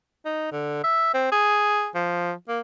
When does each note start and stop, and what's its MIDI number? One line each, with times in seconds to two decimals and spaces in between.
0.25 0.49 63
0.52 0.83 50
0.84 1.12 76
1.14 1.30 60
1.32 1.89 68
1.95 2.33 53
2.49 2.60 58